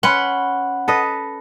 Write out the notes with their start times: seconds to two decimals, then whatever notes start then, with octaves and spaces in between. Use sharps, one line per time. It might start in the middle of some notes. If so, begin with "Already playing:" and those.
0.03 C#4 B4 F#5 B5 C6
0.88 A4 B4 D#5